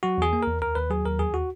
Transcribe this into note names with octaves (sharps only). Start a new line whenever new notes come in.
F#3 F#4
E2 G#4
A#3
E2 A#4
D#2 A#4
D#2 B4
F#3 G#4
D#2 A#4
E2 G#4
F#4